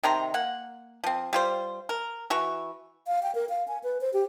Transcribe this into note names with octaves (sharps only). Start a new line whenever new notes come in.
C3 D#3 A#5 C6
A#3 F#5
F3 C4
G3 F4 C5
A#4
E3 F#4 C#6
F5
G5
A#4
F5
G#5
B4
C5
G4